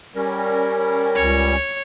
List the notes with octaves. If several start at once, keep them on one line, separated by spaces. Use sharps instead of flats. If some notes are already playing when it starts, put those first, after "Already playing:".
G3 C#4 A#4
C#2 C#5